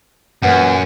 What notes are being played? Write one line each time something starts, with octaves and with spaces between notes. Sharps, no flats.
F#2 A#2 E3 F#5